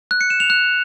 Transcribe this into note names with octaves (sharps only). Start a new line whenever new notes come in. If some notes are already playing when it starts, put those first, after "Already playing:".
F#6
C#7
E7
F7
F#6